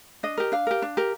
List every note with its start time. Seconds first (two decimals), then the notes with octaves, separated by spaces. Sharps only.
0.23 D4 D#5
0.38 G4 A#4
0.52 D4 F5
0.67 G4 A#4
0.82 D4
0.97 G4 A#4